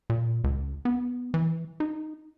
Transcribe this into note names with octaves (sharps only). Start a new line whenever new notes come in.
A#2
C#2
B3
E3
D#4